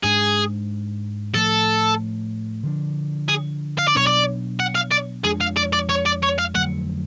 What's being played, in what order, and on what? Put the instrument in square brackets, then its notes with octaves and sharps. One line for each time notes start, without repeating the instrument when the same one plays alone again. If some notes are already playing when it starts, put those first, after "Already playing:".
[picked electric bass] G#2 G#3 D4 [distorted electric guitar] G#4
[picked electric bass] A2 F3 A3 [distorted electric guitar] A4
[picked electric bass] D3 F3 B3 D4
[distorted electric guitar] G#4
F5
D5
[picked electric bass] B2 F#3 B3 D4 [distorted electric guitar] C#5
[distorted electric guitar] D5
F#5
F5
D5
[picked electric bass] F2 F3 G#3 D4 [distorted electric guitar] G#4
[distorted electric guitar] F5
D5
D5
C#5
D5
C#5
F5
[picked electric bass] F2 D3 F#3 A3 [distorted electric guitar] F#5